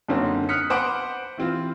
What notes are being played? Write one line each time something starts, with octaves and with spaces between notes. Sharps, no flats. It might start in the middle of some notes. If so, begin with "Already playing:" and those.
F#2 D3 A#3 C4 C#4 D#4
D#6 F6 F#6 B6 C#7
B4 C5 F#5 D6 D7
E3 C4 F4